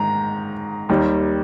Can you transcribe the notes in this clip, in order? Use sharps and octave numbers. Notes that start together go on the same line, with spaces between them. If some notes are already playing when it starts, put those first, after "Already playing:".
Already playing: G#2 D#3 A#5
D#2 D#3 G3